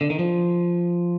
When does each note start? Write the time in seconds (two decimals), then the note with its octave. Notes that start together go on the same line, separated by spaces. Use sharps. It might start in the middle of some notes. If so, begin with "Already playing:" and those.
0.01 D3
0.10 D#3
0.19 F3